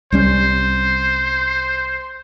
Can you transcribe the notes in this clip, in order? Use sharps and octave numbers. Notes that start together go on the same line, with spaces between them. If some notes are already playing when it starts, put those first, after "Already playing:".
C2 G3 C#4 C5